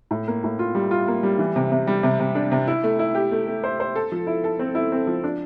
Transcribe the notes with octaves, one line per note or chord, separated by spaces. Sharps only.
A2
A#3
A2
F4
G3
F4
A#3
G3
E3
C3
C3
G3
C3
C3
D4
C3
E4
A3
E4
G4
A3
A3
C5
C5
A4
F3
E4
A4
C4
E4
C4
F3
D4